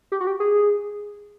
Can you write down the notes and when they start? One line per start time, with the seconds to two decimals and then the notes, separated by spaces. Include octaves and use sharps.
0.12 G4
0.20 F#4
0.27 G4
0.40 G#4